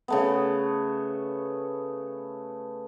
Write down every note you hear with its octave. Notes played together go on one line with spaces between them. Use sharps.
C#3 A3 B3